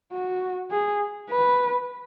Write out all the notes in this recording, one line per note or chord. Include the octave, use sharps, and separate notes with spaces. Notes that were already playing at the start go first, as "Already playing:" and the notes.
F#4
G#4
B4